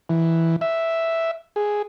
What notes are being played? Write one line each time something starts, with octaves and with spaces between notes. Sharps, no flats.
E3
E5
G#4